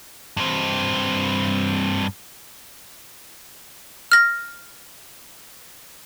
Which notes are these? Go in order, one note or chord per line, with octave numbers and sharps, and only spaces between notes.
G2 C4
F6 A#6